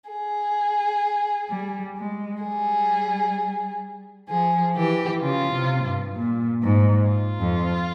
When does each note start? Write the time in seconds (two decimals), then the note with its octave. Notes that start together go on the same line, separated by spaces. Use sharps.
0.10 G#4
1.50 G3
1.96 G#3
2.43 G3 G#4
4.29 F3 G#4
4.76 E3 G4
5.22 C#3 F4
5.53 C3
5.84 G2
6.15 A#2
6.62 G#2
7.09 F4
7.40 F2